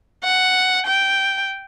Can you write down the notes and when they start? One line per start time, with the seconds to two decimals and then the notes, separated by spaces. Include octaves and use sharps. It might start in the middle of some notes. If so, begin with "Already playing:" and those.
0.24 F#5
0.86 G5